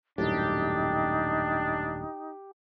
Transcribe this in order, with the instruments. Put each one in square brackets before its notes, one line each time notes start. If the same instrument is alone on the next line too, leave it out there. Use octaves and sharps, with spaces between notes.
[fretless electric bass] D#1 F#2 A2 [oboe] D4 [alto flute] D#4 [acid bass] G4